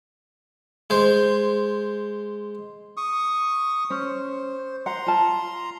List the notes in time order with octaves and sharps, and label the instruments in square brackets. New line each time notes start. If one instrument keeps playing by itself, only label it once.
[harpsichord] G#3 C5
[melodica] C#6 D#6
[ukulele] C#4 [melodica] C5
[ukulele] F#5 [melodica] A#5 C6
[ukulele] F4 A5